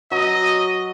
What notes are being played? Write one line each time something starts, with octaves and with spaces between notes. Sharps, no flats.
F#3 D#5